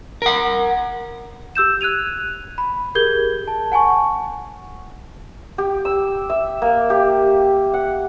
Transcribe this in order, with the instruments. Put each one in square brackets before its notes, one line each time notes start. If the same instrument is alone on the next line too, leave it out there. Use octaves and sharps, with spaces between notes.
[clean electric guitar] A#4 F#5
[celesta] G4 E6 G6 E7
F#6 G#6 D#7 F7
B5
G4 G#4 A#4 G6 G#6 G7
A5
F#5 G#5 A5 C#6
[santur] G4
E6
E5
A#3
G4
F#5